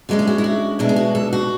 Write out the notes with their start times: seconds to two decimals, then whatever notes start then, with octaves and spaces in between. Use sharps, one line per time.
0.09 D3 G#3 C#4 F#4
0.19 G#4
0.27 F#4
0.38 E4
0.44 F#4
0.79 B2 G#3 D4 E4
0.89 G#4
0.96 F#4
1.15 A4
1.33 F#4